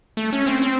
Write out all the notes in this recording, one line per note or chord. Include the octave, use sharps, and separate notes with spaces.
A3
C#4
C4
C4